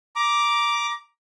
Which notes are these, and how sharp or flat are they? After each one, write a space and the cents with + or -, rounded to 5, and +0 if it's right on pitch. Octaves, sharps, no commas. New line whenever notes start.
A#5 +20 D6 +0